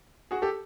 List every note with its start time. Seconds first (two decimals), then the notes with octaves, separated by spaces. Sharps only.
0.31 F#4 G#4
0.42 G4 A4